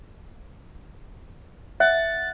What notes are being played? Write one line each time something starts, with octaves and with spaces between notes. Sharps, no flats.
E5 F#5 A6